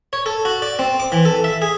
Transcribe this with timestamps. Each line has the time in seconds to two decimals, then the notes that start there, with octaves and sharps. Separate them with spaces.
0.13 C#5
0.26 A4
0.45 F#4
0.62 D5
0.79 C4
1.00 D6
1.12 E3
1.25 A4
1.44 E5
1.62 G#4